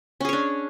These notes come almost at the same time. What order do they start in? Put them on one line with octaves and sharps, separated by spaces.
C#4 G#4 C#5 D4